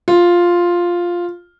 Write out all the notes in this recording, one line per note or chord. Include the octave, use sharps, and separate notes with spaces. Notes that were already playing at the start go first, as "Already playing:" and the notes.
F4